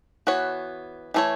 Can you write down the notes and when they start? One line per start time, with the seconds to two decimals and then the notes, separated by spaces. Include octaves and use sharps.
0.27 E3 B3 F#4 C#5
1.14 E3 A3 E4 G#4 C#5